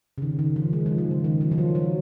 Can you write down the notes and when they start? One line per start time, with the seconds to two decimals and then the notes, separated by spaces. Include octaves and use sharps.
0.18 C#3
0.22 D#3
0.39 D#3
0.56 F3
0.73 G#3
0.86 F3
0.98 D#3
1.11 C#3
1.24 D#3
1.41 F3
1.52 F3
1.58 F#3
1.75 F#3